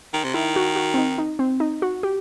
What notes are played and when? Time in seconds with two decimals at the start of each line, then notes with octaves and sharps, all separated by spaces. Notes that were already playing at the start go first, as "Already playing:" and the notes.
0.14 D#3
0.24 C3
0.34 D#3 E4
0.56 F#4
0.76 F#4
0.94 C4
0.98 D#4
1.18 D#4
1.39 C4
1.60 D#4
1.82 F#4
2.03 G4